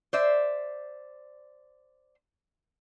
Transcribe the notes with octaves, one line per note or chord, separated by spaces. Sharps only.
C5 D5 E5